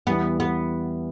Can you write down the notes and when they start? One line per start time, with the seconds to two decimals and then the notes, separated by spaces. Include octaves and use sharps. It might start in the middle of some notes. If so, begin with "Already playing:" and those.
0.07 E2 E3 G3 B3 E4
0.40 B3